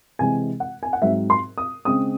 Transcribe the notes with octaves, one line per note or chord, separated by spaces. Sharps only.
C3 E3 G#3 C4 G#5
F#5
G#5
F#5
G#2 F#3 C4 E5
C6
D#6
C#3 G#3 C4 D#6